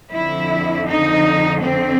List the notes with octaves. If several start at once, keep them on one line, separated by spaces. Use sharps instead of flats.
F2 D3 F3 E4
D#4
C4